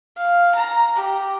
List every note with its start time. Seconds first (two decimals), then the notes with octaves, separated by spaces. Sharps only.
0.17 F5
0.55 A#5
0.96 G4